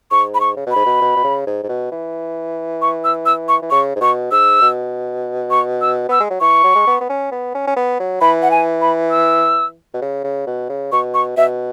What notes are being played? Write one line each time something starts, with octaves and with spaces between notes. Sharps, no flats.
G#2 C#6
B5
C#6
C#3
B2 B5
G#2
B2
B2
B2
C#3
G#2
G#2
B2
E3
C#6
E6
E6
C#6
E3
C#3 C#6
G#2
B2 C#6
G#2 E6
B2
C#6
E6
B3 E6
G#3
F#3
E3 C#6
F#3
G#3
B3
B3
C#4
B3
C#4
C#4
B3
F#3
E3 B5
F#5
G#5
B5
E6
B2
C#3
C#3
B2
C#3
B2 C#6
C#6
B2 E5